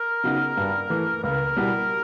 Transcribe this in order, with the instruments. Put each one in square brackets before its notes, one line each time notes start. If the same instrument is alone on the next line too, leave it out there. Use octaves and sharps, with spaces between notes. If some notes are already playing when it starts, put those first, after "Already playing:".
Already playing: [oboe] A#4
[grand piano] C#3 F#3 B3 D#4
G2
E3 A3
[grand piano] C#2 [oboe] A#4
[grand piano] B2 G3 B3 E4